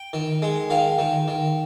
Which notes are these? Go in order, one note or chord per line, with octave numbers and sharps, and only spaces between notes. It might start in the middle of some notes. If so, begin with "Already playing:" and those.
Already playing: G5
D#3
G#3
D#3 F5
D#3
D#3